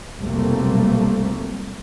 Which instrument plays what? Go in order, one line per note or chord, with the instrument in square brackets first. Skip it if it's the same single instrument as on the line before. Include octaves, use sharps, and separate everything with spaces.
[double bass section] F1 B1 G3 A3 A#3 C4